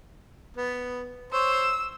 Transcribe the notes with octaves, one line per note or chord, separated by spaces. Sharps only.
B3
C5 C#5 E6